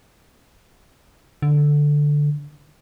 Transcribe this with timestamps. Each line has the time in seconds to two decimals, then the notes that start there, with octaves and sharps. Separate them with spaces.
1.42 D3